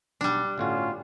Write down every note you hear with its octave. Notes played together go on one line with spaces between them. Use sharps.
B1 G3 D4
G1 A2 C#4 F4 F#4